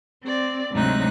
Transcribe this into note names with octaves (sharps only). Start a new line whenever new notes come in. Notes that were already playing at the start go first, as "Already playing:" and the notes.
C4 D5
D2 G#2 C3 F#3 D#4 F#6